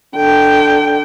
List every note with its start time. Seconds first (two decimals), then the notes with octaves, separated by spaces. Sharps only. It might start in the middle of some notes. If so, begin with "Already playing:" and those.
0.16 D3 G5